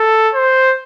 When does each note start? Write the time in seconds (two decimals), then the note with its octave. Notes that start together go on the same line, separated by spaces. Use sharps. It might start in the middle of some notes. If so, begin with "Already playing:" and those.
Already playing: A4
0.34 C5